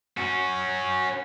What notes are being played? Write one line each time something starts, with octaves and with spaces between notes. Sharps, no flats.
C#4 F#4